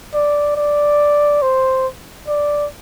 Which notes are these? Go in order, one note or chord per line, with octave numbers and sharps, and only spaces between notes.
D5
D5
C5
D5